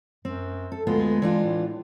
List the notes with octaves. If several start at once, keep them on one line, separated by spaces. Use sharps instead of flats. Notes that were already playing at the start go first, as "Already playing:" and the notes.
F#2 C4
A4
D2 G#3 B3 F4
E3 D4 F4
A2